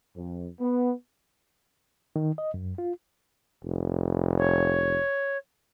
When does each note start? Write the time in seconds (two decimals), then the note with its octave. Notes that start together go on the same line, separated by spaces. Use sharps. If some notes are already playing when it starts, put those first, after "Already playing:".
0.16 F2
0.60 B3
2.16 D#3
2.38 D#5
2.54 F#2
2.78 F4
3.64 F1
4.39 C#5